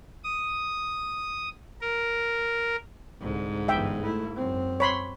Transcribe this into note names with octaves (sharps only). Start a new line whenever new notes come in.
D#6
A#4
C2 G#2 D3
G1 E3 E5 G5
A3 E4
F#2 C4
C#5 B5 C6